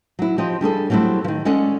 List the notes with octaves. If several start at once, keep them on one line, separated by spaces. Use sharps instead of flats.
F#3 E4
F3 C4 G4 D#5
G3 D4 G#4 A4
F#3 G3 A3 C4 E4
D#3 F3
G#3 C#4 A4 D5 D#5 F#5